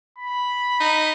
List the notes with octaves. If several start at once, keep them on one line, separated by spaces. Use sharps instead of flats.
B5
D#4